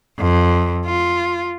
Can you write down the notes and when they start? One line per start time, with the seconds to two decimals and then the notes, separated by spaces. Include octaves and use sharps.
0.19 F2
0.86 F4